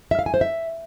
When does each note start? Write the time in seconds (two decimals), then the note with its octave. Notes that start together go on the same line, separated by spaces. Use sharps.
0.11 E5
0.19 F5
0.26 G#5
0.34 C5
0.41 E5